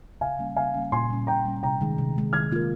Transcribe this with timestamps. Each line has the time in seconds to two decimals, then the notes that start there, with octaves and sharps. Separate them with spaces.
0.21 C#3 F5 G#5
0.39 G3 A#3 C#4
0.56 C#3 F5 G#5
0.74 G3 A#3 C#4
0.92 A#2 G#5 C6
1.10 G3 C#4
1.27 A#2 G5 A#5
1.45 G3 C#4
1.63 C3 G5 A#5
1.81 D#3 G#3
1.98 C3
2.16 D#3 G#3
2.33 D#3 F6 G#6
2.52 A#3 F4 A#4